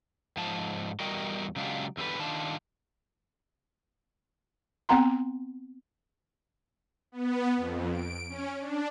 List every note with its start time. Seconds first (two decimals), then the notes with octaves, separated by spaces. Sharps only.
0.37 G#2 F3 A5
1.00 E2 G3 F#4 A#4 D#5 G5
1.56 C#3 F#3 G#3 D4 F4 G4
1.97 E2 D3 G3 B4
2.19 D#3 D4 F4 A5
4.89 B3 C4 F#5 A#5 C6
7.12 B3
7.56 F2
7.90 D7
8.29 C#4
8.59 D4